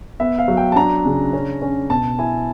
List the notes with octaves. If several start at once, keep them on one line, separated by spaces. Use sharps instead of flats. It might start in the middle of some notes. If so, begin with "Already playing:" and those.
B3 E5
F5
F#3
G5
A5
D4 A#5
C#3
C#4
C#4
B2 A5
E4 G#5